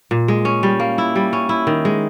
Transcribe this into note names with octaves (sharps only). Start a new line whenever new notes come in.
A#2
G#3
C#4
G3
A#3
E4
G3
C#4
E4
D#3
G#3